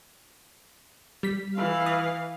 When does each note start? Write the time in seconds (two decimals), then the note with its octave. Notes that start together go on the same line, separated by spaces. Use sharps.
1.23 G3 B6
1.55 E3 F5
1.86 D#6